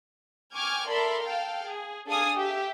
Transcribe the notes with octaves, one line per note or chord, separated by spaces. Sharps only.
G5 G#5 C#6 D6 F6 G#6
A4 A#4 D5 E5 B5 C6
A4 F5 G5 A5
G#4
D4 G#4 A4 F5 G#5 D#6
G4 E5